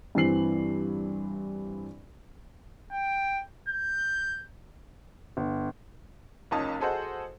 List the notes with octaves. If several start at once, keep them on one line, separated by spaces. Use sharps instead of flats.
G2 E3 C4 C7 F#7
G5
G6
G1
F#1 C#2 C#4 D#4 A5 D#6
F#4 G#4 A4 C5 D#5 F#5